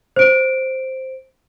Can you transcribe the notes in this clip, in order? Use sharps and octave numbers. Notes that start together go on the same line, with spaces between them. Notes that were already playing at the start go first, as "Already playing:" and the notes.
C5 D7